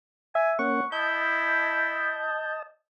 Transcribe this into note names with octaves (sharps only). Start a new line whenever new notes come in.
E5 G#5
A#3 C#4 F#5 C#6
E4 D#5 A5 G6